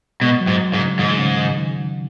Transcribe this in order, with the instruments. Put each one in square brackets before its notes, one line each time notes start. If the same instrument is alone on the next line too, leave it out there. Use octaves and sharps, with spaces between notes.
[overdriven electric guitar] B2 [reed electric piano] G#3
[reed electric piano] F#3
[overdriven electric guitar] G#2
G#2
[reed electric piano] C#3
[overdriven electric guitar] G#2 [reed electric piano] D#3
[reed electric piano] C#3
D#3